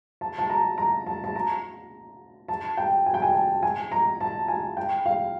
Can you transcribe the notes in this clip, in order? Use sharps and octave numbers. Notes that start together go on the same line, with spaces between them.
A5
A5
A#5
A#5
A5
A5
A#5
A5
G5
G#5
G5
G#5
A5
G#5
A#5
A5
G#5
G5
F5